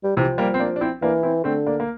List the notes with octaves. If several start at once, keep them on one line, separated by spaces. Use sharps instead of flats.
G3
C3 E3 F3
G3 A#3
C4
A#3 D4
D4
C4 E4
E3 A#3 D4
C4 E4
D3 A3 C4
A#3 D4
A#3